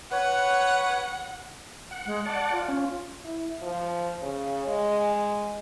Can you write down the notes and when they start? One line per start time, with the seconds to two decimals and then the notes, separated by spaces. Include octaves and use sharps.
0.11 B4 C#5 F#5
1.91 F#5
2.06 G#3
2.26 D5 F#5 A5
2.52 F4
2.68 C#4
3.25 E4
3.62 F3
4.22 C#3
4.68 G#3